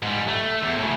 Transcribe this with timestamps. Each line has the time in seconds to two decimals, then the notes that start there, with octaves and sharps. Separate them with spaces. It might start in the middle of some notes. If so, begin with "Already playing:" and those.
0.03 G#2 G3
0.29 A3
0.63 E2
0.78 A2 C#3